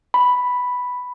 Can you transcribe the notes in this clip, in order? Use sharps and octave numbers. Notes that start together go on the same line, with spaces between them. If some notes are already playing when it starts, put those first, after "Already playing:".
B5